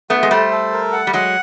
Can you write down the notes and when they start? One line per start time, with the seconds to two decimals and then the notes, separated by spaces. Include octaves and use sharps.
0.10 A3 B3 F#4
0.23 G#3
0.31 G3 A3 C5
0.51 A4
0.72 A#4
0.92 F#5
1.07 G3
1.13 F#3 G#3 F#5